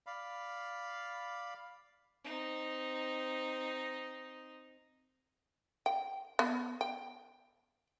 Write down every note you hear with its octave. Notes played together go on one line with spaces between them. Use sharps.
D5 F5 B5
C4 D#4
G5
B3
G5